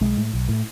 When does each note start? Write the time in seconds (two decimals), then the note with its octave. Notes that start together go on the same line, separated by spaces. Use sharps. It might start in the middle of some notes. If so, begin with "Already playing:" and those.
0.01 B1 G#3
0.17 A2
0.34 B1
0.49 A2